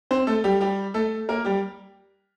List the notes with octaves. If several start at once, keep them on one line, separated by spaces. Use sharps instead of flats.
C4 C5
A3 A4
G3 G4
G3 G4
A3 A4
A#3 A#4
G3 G4